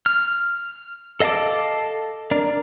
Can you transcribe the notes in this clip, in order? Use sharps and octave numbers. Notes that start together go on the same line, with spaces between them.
F6
A4 D#5 F5 A5 D6
D4 A#4 D5